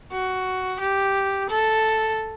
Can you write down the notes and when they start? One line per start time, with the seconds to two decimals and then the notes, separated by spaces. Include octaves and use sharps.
0.12 F#4
0.80 G4
1.50 A4